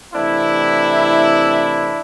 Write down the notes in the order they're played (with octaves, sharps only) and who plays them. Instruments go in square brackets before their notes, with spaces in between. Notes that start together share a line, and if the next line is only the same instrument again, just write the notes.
[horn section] C3 E3 A3 C4 D4 E4